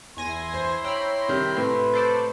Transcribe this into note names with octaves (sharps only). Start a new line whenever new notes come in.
E2 E4 G#5 C6 A#6
C5
C#5 G5 A#5 B5 E6
C3 D#3 G3
A2 C3 B4
A4 C5 D5